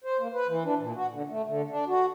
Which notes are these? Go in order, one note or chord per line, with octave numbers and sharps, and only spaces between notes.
C5
A#3
B4
E3
D4
A#2
F#4
D3
A3
D3
D4
F#4